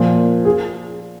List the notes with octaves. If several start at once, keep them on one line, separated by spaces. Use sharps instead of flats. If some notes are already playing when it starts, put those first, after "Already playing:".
Already playing: A#2 F3
G#4